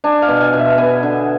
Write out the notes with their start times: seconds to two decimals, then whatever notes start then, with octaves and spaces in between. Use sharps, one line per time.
0.04 D4 G#5
0.22 F5
0.28 B2
0.41 G#5
0.53 B2
0.59 E5
0.78 B3 G#5
1.03 D3